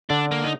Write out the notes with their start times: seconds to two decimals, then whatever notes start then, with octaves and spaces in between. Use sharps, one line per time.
0.10 D3 D4
0.31 A#3
0.44 D#4